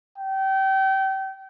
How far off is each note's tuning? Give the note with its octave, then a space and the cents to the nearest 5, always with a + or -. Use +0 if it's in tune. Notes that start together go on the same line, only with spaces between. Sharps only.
G5 -30